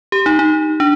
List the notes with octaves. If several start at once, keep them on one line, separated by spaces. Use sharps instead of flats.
G4
D#4
D#4
D4